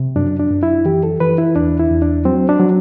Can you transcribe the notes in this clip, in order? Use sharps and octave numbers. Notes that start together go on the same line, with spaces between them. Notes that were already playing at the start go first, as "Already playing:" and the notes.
Already playing: C3
F#2 D4
D4
F#2
E4
E3 G4
A4
E3 B4
E4
E2 D4
E4
E2
D4
F#3 C4
D4
F#3